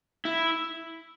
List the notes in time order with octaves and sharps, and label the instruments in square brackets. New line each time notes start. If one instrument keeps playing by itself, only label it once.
[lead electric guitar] E4